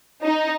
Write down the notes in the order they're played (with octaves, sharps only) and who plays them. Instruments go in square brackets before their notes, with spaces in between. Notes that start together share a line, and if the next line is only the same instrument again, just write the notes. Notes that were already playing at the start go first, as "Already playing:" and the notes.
[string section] D#4